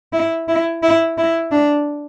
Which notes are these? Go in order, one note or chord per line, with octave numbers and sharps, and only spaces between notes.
E4
E4
E4
E4
D4